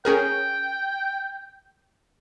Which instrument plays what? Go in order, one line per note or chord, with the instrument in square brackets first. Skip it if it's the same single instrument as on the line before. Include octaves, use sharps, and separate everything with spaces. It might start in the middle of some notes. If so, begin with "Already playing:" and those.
[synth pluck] C#4 G#4 A#4 [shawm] G5